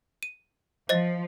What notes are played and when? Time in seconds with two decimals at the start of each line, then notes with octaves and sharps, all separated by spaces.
0.23 D#7
0.89 F3 C5 D#5 A6